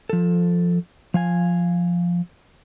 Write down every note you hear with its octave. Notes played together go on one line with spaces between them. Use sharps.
F3 A4
F3 F5 G#5